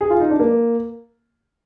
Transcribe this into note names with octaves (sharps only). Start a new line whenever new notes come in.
G#4
F4
D#4
D4
A#3